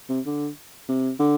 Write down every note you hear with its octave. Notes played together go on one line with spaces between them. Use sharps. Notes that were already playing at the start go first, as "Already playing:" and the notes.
C3
D3
C3
D3